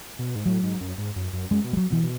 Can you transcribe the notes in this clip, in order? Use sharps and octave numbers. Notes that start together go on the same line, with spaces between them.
B2
G#2
A2 F#3
G#2
F#2
G#2
F#2
F#2
F#2 G#3
B2
G#3
F#3
B2 E3
B2